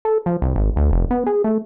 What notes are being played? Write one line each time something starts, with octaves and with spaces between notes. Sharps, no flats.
A4
F3
C2
G#1
D2
F1
B3
G#4
A3